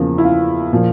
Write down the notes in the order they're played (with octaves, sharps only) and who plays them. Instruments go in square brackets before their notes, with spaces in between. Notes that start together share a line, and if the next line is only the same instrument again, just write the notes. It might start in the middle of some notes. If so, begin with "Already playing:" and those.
Already playing: [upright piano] E2 C#3 F3 A#3
E4
F4
A#2 F3